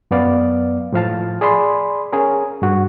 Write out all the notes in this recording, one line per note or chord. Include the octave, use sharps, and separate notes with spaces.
F#2 B3 D5 F5
A2 F3 F5 A5
G#4 D5 B5 C6
C#4 G#4 A#4
G2 F#4